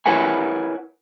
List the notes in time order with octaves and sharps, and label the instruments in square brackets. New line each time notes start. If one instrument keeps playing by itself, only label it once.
[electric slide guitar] E4 A#4 B4 C#5 F#5 G#5